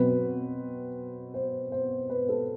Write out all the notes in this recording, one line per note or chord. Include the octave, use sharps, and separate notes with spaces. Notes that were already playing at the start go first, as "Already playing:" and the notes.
Already playing: B2 F#3 C4 B4
C5
C5
B4
A4